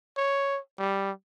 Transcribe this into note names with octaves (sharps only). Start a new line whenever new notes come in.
C#5
G3